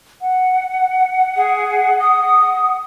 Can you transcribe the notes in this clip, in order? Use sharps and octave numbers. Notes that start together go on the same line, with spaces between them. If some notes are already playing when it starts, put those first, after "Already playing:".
F#5
G#4
D#6